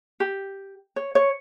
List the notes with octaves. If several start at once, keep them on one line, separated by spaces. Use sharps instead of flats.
G4
C#5
C#5